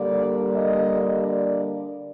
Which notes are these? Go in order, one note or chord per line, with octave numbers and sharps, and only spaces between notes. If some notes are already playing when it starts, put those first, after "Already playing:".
Already playing: D3 G3 A#3 D4 D5
D#5
D5